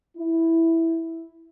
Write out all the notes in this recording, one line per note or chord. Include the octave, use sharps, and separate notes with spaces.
E4